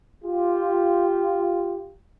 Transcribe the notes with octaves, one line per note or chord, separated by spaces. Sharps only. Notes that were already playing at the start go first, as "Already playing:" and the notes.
F4 G4